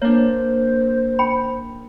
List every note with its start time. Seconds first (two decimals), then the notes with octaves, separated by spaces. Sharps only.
0.02 A#3 D4 C5 C#5
1.19 G5 B5